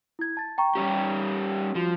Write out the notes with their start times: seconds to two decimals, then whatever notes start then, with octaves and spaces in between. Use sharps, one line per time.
0.19 E4 G#6
0.37 A5 A6
0.58 G5 A#5 C#6
0.75 G3 C#4 G4
1.75 F3 F#4